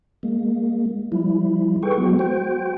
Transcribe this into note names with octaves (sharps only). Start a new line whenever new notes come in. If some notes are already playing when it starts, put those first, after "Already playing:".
G#3 A#3
F3 G3 E4
G#4 A4 B4 G5 C#6
F#3 G#3 B3 F#4
F#4 C5 G5